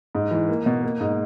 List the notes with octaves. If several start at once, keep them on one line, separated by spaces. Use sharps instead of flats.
G#2
E3
A#3
B2
A#3
G#2